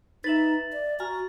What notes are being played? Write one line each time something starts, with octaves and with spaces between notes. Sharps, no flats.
D#4 B4 E5 A6 F#7
D5
F#4 G#5 A#5 F6